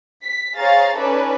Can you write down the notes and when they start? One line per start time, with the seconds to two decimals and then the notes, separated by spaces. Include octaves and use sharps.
0.23 B6
0.57 G#4 C5 C#5 F5 A#5 A6
0.97 C#4 D#4 A4 B4 C#5 D5